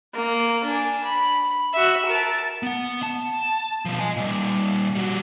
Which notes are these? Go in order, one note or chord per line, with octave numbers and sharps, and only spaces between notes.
A#3
D4 G#5
B5
F#4 E5
A#4 A5
B3 F#5
A5
B2 F3
D#5 G#5
A#2 G3
G3 F#4